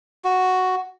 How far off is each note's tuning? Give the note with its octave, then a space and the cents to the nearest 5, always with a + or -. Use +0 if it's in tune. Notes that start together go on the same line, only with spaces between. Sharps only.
F#4 +0